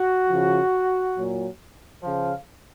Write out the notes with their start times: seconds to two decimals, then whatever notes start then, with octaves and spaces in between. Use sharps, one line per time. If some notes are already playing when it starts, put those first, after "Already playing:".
Already playing: F#4
0.29 C#3 F3
1.16 A#2 F#3
2.03 C#3 F3 F5